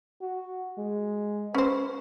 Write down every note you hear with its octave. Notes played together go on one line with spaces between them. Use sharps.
F#4
G#3
C#4 B4 C5